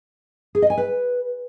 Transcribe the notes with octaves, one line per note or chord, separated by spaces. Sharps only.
G#4
D#5
G#5
B4